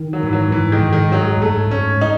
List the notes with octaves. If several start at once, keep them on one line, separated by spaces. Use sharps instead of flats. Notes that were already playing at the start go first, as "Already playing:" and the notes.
Already playing: D#3
F#3
G#2 E3
F#3
G#2 E3
D#3
G#2
D#3
F#3 G#3
G#2 A3
G#2 C#4
D#4